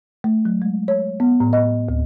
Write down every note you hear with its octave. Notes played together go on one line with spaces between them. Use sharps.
A3
F#3
G#3
C#5
B3
A2
D#5
D2